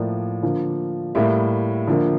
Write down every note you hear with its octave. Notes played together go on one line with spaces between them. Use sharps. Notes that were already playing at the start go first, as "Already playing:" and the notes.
Already playing: A2 F3 A#3 D5
D3 F3 A#3
A2 G3 A#3 E5
D3 F3 A#3